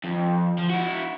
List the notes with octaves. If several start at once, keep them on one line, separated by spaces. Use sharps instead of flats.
F2
F3
E4 F#4